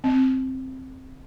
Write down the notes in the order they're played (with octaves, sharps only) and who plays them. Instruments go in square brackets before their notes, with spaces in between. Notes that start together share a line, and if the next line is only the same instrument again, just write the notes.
[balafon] C4